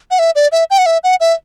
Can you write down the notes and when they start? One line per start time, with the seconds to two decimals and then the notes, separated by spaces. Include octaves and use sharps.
0.11 F#5
0.19 E5
0.35 D5
0.52 E5
0.71 G5
0.78 F#5
0.86 E5
1.04 F#5
1.20 E5